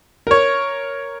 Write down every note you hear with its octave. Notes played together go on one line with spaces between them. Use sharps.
A#4 C#5